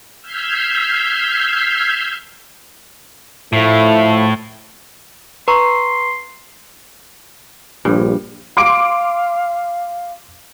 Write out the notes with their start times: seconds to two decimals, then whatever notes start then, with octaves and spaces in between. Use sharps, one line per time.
0.21 E6 F6 G6 G#6 B6 C7
3.53 A2 F3 A3 E4
5.48 B4 A#5 C6 C#6
7.85 A#1 G2 G3
8.57 F5 C6 D6 D7